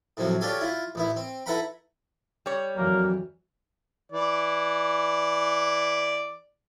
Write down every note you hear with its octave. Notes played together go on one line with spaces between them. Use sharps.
A2 C3 F3 F#3
C#4 D4 F4 G4 A4 G#5
E4 F4
A1 B3 E4
C4
E4 A4 B4 F#5 A#5 B5
G3 C#5
F2 E3 F#3 A#3
E3 D5